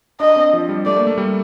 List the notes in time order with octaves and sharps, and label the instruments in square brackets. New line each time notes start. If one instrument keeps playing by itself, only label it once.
[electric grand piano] D4 [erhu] D#5
[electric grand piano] C4
F3
G3
[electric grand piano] A3 [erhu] D5
[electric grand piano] A#3
A3
G3